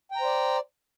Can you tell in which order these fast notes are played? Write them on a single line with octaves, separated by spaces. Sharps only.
G5 A#5 C5 D5